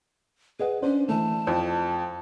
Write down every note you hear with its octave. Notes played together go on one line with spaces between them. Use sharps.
G#4 B4 D#5 F#5
C#4 D4 C5
E3 A3 A5
F2 E4 C5